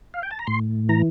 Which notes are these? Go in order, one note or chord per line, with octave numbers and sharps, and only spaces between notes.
F5
G5
A5
A#5
A2 C6
E3 A#5